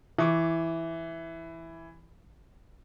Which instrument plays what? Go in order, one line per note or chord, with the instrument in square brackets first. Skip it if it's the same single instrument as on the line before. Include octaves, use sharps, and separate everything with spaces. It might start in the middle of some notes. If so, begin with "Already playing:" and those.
[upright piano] E3 [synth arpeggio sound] E4 C#6 D6